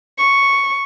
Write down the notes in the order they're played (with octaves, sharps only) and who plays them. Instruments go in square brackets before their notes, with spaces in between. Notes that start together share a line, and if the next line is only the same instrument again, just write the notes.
[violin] C#6